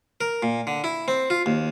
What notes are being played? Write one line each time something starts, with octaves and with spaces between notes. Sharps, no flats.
A#4
A#2
D3
E4
C4
F4
D#2